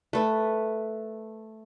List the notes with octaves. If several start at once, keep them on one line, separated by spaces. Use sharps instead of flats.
A3 B4